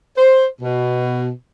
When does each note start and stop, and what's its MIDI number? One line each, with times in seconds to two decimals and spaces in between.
0.17 0.47 72
0.62 1.29 47